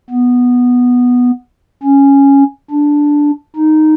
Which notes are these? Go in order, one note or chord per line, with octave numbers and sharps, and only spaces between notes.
B3
C#4
D4
D#4